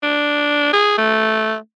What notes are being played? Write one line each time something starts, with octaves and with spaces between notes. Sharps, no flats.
D4
G#4
A3